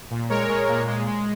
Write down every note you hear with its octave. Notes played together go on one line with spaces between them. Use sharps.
A#2
G#3 A#4 C#5
G#3
A#2
G#3
G#3